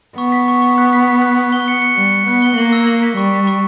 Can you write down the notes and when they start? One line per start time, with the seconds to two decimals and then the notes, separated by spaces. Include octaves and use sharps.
0.17 B3 C#6
0.32 B6
0.48 C#6
0.62 C#6
0.78 F#6
0.93 B6
1.08 B6
1.22 F#6
1.38 F#6
1.52 G7
1.68 C#7
1.82 C#7
1.97 G3 C#7
2.12 C#7
2.27 B3 F#6
2.42 G7
2.57 A#3 F#7
2.73 E6
2.87 F#7
3.02 B6
3.16 G3 C#6
3.32 B6
3.47 C#6